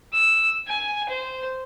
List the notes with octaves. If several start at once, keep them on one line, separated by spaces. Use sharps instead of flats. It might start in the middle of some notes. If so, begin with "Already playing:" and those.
E6
G#5
C5